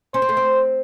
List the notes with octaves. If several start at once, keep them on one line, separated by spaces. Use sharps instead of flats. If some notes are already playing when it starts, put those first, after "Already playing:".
C#4 C5
C4
A3
C4